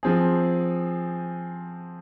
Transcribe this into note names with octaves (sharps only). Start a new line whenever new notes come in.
F3 C4 G#4